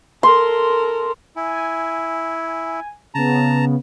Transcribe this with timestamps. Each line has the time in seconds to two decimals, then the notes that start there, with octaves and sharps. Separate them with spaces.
0.23 A4 A#4 C6
1.36 E4 G#5
3.15 C#3 B3 A5 A#5